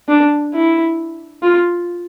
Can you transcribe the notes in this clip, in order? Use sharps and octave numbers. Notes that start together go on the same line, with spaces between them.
D4
E4
F4